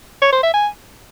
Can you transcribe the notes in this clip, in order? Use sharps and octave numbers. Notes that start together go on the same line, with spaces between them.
C#5
C5
E5
G#5